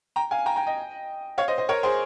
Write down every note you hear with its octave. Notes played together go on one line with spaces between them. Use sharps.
G5 A#5
F5 G#5
G5 A#5
G5 A#5
D#5 G5
C#5 F5
C5 D#5
C5 D#5
A#4 C#5
G#4 C5